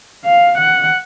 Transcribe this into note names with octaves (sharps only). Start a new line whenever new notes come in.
F5
F#5